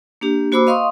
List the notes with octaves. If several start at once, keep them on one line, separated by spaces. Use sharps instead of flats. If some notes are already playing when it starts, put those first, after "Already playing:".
A#3 D4 G4
A#3 F#4 C5 B5 D6 E6
D#5 F5 C6 C#6 D#6